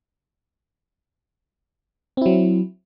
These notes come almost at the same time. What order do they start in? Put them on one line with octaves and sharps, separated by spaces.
C4 E4 F#3